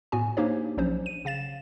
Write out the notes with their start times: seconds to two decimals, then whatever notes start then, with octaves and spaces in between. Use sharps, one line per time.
0.12 A2 B3 F#4 G#5
0.37 A#3 D4 D#4 G4 C5 C#5
0.77 A#1 F3 F#3 C#4 D4 C5
1.06 D#7
1.25 C#3 F5 A6 E7